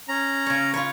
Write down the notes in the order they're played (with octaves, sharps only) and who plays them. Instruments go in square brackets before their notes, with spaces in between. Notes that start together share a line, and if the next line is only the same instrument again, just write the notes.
[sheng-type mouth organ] C#4 A#5
[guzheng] C#3 C#5
F4 B4 C#5